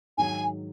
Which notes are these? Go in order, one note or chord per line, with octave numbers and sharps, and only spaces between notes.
G#2 D#3 F#3 G#5